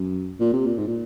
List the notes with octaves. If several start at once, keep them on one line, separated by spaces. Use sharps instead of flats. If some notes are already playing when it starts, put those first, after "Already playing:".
Already playing: F#2
A#2
C3
A#2
G#2
A#2